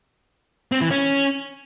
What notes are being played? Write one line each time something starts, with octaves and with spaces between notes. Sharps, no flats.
C4
E3
C#4